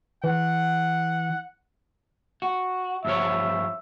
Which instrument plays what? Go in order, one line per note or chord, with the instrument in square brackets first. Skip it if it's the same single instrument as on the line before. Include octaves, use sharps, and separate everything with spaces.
[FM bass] E3 [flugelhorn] F#5
[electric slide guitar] F#4
[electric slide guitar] G2 F3 C#5 [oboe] E5